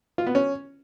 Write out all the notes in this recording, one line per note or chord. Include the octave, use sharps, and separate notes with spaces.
F4
B3
C#4